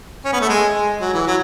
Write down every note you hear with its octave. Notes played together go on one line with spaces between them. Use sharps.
C#4
B3
A3
G#3
G#3
F#3
E3
F#3